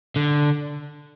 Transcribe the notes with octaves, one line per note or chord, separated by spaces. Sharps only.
D3